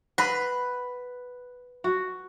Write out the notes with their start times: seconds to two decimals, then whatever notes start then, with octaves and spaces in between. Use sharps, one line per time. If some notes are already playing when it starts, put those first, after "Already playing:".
0.18 B4 F#5 B5
1.84 F#4